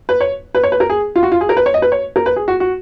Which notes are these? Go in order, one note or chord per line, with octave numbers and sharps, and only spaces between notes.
B4
C#5
B4
C#5
B4
A#4
G#4
F4
F#4
F4
G#4
A#4
B4
C#5
D#5
B4
C#5
A#4
B4
G#4
F#4
F#4